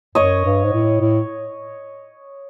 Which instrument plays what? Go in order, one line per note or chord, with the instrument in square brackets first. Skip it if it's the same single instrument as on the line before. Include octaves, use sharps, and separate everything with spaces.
[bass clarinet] F#2 [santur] C#5 D#5
[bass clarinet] G2
G#2
A2
A2